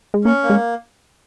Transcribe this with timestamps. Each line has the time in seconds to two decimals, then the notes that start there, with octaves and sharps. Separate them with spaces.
0.14 G#3
0.25 A#3 C#4
0.43 A#3
0.50 G#3